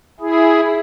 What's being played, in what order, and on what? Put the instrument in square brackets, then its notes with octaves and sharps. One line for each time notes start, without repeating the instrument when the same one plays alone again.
[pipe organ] E4 G#4